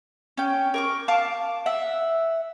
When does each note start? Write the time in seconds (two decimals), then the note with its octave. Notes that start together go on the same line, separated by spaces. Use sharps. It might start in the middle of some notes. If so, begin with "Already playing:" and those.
0.37 C#4 G5
0.74 A#4 C#6 D6
1.08 F5 A5 D6
1.66 E5 F#5